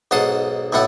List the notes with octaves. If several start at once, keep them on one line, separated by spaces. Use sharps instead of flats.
B1 G#2 F#5 A5 C6 D#6
B1 A2 A3 F#5